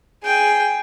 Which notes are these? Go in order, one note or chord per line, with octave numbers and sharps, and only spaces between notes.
G#4 G5